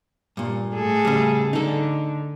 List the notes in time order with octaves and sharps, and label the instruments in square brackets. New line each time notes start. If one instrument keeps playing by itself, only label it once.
[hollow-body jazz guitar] G2 A#2
[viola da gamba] A2 G#4 A4
[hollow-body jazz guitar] C#3 G3
[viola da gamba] D3 [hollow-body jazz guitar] D#4 A4